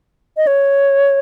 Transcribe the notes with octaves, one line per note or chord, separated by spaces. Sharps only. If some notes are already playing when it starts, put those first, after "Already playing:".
D#5
C#5